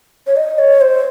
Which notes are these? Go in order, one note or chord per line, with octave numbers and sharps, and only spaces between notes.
C#5
D#5
C#5
C5